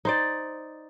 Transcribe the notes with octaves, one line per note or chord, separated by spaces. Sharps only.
D#4 C5 D5